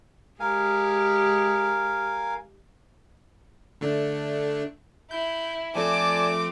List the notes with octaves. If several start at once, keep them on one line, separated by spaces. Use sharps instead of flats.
G#3 G4 A#4 F5 G#5
D3 A3 D4
E4 G6
F3 A3 C4 D5 G#5 A5 D6